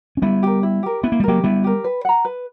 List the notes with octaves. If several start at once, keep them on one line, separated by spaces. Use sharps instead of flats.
C#4
G3 B3 E4
G4 A#4
E4
G4 A#4
B3 E4
A#3
G3
F#3 A#3 G4 A#4
G3 B3 E4
G4 A#4
B4
F#5 A#5
B4